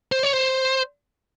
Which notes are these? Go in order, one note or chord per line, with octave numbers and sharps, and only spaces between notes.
C5
C#5
C5